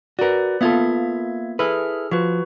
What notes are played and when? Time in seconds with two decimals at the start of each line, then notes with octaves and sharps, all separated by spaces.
0.19 F#4 A#4 B4 D5
0.61 A#3 B3 F4 A4 E5 G#6
1.59 E4 G#4 A4 B4 F6
2.11 F3 F#4 B4